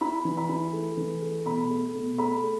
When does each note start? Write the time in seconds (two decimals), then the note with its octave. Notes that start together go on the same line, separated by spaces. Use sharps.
0.01 E4 B5
0.25 E3
0.37 B5
0.49 E4
0.73 A3
0.97 E3
1.22 A3
1.46 B2 B5
1.70 A3
1.95 B2
2.18 A3 B5
2.43 A3